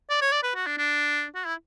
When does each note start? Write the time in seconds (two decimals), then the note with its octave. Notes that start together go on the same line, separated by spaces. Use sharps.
0.09 D5
0.21 C#5
0.32 D5
0.43 B4
0.55 F#4
0.66 D4
0.78 D4
1.35 F#4
1.46 E4